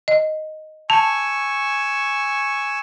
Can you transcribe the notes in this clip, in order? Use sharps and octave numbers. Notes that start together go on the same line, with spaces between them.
D#5
G#5 A5 C#6 E6